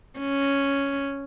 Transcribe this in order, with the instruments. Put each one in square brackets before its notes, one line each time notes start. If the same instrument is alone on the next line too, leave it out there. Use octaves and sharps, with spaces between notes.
[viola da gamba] C#4